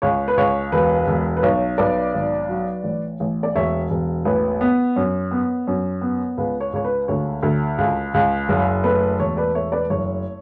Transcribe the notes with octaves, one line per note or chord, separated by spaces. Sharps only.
C#2 C#5
B4
C#2 C#5
E1 B4
E1
B4
B1 C#5
B1 B4 D5
G#1
F#3
A1
A1
D5
E1 C#5 E5
E1
A1 B4
B3
F#2
B3
F#2
B3
C#2 B4
C#5
C#2 C#5
B4
D2 C#5
D2
C#2
C#2
F#1
A3 B4
E1 C#5
B4 D5
A3 C#5 E5
B4 D5
F#1 C#5